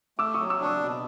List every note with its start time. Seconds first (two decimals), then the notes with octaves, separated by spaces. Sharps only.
0.18 A3 D6 E6
0.34 C#6 D#6
0.40 F#3
0.50 D6 E6
0.61 D4 C#6 D#6
0.80 B2